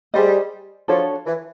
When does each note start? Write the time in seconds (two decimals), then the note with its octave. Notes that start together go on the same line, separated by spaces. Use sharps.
0.14 G3 G#4 C5 D#5
0.88 F3 D4 F#4 A4 C#5
1.26 E3